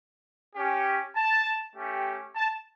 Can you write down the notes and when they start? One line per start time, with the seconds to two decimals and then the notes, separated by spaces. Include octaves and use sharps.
0.55 C#4 G4
1.16 A5
1.75 A3 C#4 G4
2.35 A5